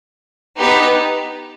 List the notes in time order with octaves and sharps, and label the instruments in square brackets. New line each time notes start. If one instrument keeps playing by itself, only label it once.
[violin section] B3 D#4 G4 B4